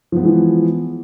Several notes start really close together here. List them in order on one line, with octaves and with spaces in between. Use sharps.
F3 B3 G#3 E3